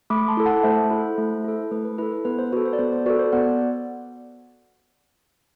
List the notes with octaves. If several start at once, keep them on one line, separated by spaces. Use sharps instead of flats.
A3 B5 D6
A5 C6
E4 A4
F#5 A5
A3 C5 E5
E4 A4
A3
E4 A4
A3 B4
B4
E4 A4 B4
B4
B3 B4
C5
F#4 A4 B4
C5
D5
B3 C5
C5
F#4 A4 B4 D5
C5
B3 D5 F#5